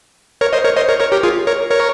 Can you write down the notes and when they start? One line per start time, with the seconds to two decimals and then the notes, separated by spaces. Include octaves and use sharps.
0.41 A#4 C#5
0.53 C5 D#5
0.64 A#4 C#5
0.76 C5 D#5
0.89 A#4 C#5
1.00 A#4 C#5
1.12 G4 A#4
1.23 F4 G#4
1.47 A#4 C#5
1.70 A#4 C#5